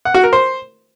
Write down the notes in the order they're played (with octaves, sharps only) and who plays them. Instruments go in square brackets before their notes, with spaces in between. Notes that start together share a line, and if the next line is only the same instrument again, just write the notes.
[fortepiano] F#5
F#4
A#4
C5